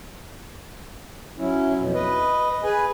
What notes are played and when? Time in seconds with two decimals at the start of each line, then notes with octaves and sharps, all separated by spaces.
1.38 F#3 C#4 E4
1.78 F2 B2
1.94 B4 D#5
2.64 G#4 B4 G#5